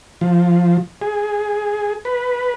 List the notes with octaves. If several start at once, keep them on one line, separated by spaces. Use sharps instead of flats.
F3
G#4
B4